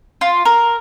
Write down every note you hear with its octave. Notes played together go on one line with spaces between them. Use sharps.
F4
A#4